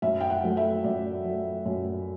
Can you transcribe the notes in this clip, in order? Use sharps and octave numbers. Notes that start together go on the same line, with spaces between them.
F#2 E5
G5
F#5
F#3 A3
E5
F#2 D5
F#3 A3
F#2